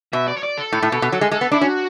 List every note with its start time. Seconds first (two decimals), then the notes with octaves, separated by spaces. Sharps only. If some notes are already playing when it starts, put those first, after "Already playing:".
0.13 B2 E5
0.28 D5
0.37 C#5
0.43 D5
0.57 A4
0.72 A2
0.82 A2
0.92 B2
1.02 B2
1.12 F#3
1.21 G#3
1.31 G#3 A4
1.41 B3
1.51 D4 E4
1.61 C#4 F#4